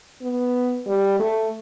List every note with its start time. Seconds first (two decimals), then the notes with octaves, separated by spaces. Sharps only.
0.22 B3
0.87 G3
1.19 A3